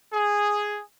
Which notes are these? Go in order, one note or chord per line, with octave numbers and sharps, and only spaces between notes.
G#4